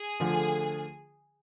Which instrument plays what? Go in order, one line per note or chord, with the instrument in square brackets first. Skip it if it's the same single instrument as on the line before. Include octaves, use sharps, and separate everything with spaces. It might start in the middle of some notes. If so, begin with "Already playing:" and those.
Already playing: [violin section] G#4
[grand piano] D3 F3 A3